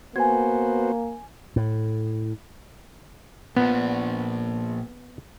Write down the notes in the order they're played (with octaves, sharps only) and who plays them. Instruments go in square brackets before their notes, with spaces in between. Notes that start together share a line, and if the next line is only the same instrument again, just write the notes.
[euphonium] A#3 [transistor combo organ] B3 F#4 C5 [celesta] G#5 G#6
[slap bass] A2
[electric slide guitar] A#2 F3 [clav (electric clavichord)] B3